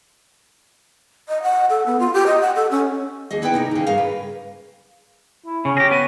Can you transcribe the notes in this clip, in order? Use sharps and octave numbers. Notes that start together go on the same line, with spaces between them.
D#5
F#5
A4
B3
F4
G4
D#5
F#5
A4
C#4
D#2 G#4 D#5
B3 E4 A4 B4 E5 G5
C3 D#4 A#4
D#2 C#3
G2 C#3 G#4 A#4 F5
B4
E4
C#3 C#4
G4 G#4 A#6
B3 D#7